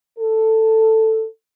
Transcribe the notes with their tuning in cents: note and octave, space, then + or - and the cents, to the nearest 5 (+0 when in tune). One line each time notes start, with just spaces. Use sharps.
A4 +10